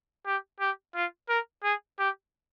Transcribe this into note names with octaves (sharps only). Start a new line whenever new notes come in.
G4
G4
F4
A#4
G#4
G4